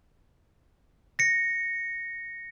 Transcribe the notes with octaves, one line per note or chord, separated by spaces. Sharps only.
A#6 C#7